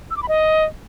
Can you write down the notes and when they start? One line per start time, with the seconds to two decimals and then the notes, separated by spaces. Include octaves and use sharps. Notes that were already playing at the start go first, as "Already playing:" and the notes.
0.11 E6
0.17 D6
0.23 B5
0.29 D#5